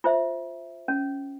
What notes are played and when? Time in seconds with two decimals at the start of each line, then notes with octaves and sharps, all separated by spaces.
0.04 F4 C5 E5
0.88 C#4